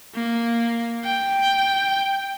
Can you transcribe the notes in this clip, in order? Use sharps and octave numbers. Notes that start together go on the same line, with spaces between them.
A#3
G5